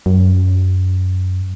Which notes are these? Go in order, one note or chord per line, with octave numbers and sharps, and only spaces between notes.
F#2